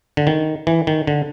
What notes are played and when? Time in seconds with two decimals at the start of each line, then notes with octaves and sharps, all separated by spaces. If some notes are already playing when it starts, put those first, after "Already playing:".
0.17 D3
0.27 D#3
0.67 E3
0.87 D#3
1.07 D3